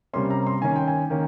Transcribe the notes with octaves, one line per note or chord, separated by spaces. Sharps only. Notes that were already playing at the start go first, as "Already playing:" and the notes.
C3 G3 A#3 C#4 C6
A#5
C6
D#3 A#3 C#4 G#5
G5
G#5
D#3 A#3 C#4 G5